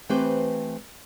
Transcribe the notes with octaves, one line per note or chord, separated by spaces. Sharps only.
E3 A3 C4 G4 B4 C5